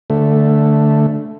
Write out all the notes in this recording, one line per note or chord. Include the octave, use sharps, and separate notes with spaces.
D3 A3